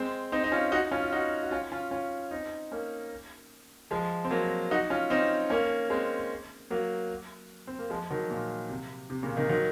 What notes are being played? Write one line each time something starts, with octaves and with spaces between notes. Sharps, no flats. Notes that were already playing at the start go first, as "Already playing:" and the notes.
Already playing: G#3 C4
C4 D#4
D#4
C#4 F4
D#4 F#4
C#4 F4
F4
D#4 F#4
F#4
C#4 F4
C#4 F4
C#4 F4
C4 D#4
A#3 C#4
F3 G#3
C4
F#3 A#3
D#4 F#4
C#4 F4
C4 D#4
A#3 C#4
G#3 C4
F#3 A#3
C4
A#3
F3 G#3
D#3 F#3
A#2
C3
C3
A#2 C#3
C3 D#3
D#3 F#3